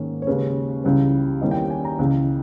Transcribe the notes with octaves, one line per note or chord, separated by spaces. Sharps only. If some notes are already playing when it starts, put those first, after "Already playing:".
Already playing: G#2 D#3 A#3 C#4
C#5
D#2 C#3 G#3 C#4 B4
C#2 C#3 E3 G3 C#5
E2 D#3 G3 A#3 C#4 D#5
G5
G#5
A#5
C#2 C#3 E3